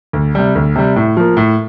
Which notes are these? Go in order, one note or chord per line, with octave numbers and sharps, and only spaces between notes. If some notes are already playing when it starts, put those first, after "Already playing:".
D2
C3 G3
D2
C3 G3
A2
F3 A#3
A2